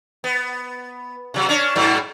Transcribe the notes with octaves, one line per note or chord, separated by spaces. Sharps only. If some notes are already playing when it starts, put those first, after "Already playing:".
B3
C3 F#3
C#4 D4
G#2 B2 F#3